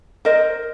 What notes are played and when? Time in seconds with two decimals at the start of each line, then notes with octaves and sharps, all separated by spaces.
0.25 A#4 C5 D#5